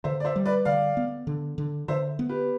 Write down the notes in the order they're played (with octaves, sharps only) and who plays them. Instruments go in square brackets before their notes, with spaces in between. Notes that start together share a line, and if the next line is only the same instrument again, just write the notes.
[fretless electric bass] D3 [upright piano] C5 E5
[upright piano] D5
C5 E5
[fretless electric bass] G3
[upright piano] B4 D5
[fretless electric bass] D3 [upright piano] D5 F5
[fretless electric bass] B3
D3
D3
[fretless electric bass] D3 [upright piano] C5 E5
[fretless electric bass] B3
[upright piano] G4 B4